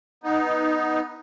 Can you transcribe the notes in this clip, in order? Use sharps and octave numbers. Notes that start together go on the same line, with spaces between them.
B3 D#4